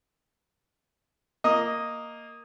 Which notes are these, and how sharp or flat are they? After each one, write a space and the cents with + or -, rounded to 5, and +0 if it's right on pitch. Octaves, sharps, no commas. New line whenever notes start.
A#3 +0 D#5 +0